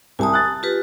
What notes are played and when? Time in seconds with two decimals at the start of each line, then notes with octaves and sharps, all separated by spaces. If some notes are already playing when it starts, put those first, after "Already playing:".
0.19 C2 G#5 A5 D#6
0.33 F#6 A6
0.63 F4 G4 B4